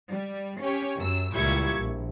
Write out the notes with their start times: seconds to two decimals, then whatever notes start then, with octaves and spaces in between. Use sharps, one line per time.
0.11 G3
0.62 C#4 G4 C#5
0.98 F#2 E6
1.33 C#2 A#2 G3 E4 C#6 G#6
1.77 A#1